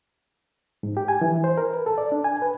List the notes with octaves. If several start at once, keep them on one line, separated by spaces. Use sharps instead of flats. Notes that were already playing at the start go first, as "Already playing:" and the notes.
G#2
G4
G#5
E3
C5
A#4
B4
A4
D5
D4
G#5
B4